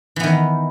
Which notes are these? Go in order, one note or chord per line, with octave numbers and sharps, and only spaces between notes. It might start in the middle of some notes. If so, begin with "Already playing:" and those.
D#3 E3 B3